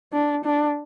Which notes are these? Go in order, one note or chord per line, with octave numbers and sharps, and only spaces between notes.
D4
D4